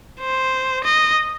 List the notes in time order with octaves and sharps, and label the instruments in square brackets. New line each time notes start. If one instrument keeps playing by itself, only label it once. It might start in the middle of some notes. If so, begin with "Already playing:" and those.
[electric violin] C5
D#5